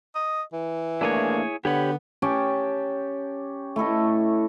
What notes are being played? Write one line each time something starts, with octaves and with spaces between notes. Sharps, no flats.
D#5
E3
A3 A#3 D4 E4 G#4 C#5
D3 B3 G4 C#5 B5
C#4 G4 G5 A5
A3 E4 A4 D#5